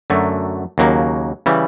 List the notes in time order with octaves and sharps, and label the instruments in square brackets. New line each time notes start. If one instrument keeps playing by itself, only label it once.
[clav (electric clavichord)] F#2 D3 F#3 A3
D#2 C#3 F#3 A#3
C#3 E3 G3